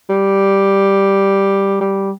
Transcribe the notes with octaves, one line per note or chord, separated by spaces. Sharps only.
G3
G3